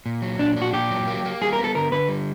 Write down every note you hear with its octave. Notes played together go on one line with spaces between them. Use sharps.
A#2
F#3
A#2 D4
D4
F#4
A#2 G4
F#3
A#3
A#3
G3 G#4
A#4
B3
A4
D3 A#4
D3 B4
G3